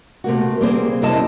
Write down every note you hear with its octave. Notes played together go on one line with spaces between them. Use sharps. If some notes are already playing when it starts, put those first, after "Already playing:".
C3 A3 A#3 F#4
G3 A#3 C4 G#4 C5
F#2 C3 E4 D#5 A5